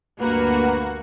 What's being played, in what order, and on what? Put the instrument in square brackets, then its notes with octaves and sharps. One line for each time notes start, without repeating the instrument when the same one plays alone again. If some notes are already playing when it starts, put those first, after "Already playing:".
[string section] D2 A#3 F#4 [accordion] G2 B4